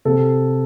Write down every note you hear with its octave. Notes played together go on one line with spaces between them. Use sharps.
C3 A4